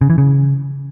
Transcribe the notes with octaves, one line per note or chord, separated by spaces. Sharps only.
C#3
E3
C#3